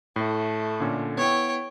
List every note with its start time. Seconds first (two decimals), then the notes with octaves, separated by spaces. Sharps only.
0.16 A2 A3
0.80 A#2 D3 C#4
1.17 B3 E4 C#5 G5